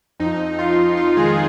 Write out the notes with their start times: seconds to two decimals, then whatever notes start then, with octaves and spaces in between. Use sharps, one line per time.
0.20 F2 D#4
0.39 F2
0.58 F2 F4
0.78 F2
0.97 F2 F4
1.17 D#3 G#3 G#4